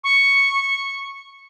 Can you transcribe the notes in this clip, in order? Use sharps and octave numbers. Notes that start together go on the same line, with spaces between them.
C#6